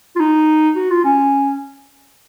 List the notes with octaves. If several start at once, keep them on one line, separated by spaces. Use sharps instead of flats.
F4
D#4
F#4
F4
C#4